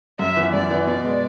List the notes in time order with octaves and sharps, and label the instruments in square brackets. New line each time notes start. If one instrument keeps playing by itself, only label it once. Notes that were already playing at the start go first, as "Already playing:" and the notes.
[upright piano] F#2 [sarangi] E5
[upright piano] E3 B3
[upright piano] F#2 [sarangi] D5
[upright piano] E3 B3
[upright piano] B2 [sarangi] D5
[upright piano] G#3 B3